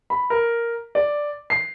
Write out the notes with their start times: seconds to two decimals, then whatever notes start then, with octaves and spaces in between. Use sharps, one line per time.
0.10 B5
0.30 A#4
0.95 D5
1.50 C7